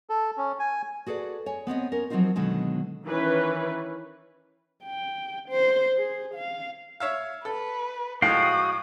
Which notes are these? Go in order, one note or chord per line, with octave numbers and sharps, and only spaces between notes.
A4
C#4
G#5
F#4 G#4 A4 B4 D5
C#5 G#5
B3 C4 C#5 D#5
C#4 A#4
F3 F#3 A3 C4 D#4 F4
B2 D3 D#3 F#3 G#3
D#3 E3 C#4 B4
G5
C5
G#4
F5
C#5 E5 F5
A4 B4
A2 F3 G#3 F#4 F5 G5 D#6